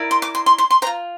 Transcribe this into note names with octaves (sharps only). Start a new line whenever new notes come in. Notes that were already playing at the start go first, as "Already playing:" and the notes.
Already playing: E4 A#4 D5
C6
D6
C6
C6
C6
C6
C5 A#5
F4